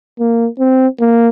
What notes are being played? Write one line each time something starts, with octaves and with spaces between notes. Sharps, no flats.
A#3
C4
A#3